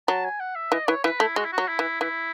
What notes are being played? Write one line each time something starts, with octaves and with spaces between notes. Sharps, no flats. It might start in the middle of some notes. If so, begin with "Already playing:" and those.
F#3 A5
G#5
F#5
E5
E3 D#5
E3 C#5
E3 B4
A3 E4
G#3 F#4
E4
F#4
F#3
E4
E3
E3 E4